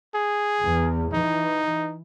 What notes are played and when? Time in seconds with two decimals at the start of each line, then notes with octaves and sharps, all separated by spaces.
0.14 G#4
0.62 E2
1.13 E3 D#4